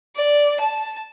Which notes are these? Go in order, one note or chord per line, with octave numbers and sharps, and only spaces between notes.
D5
A5